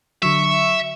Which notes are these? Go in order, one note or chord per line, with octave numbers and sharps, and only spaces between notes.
D3 F#3 E5 C#6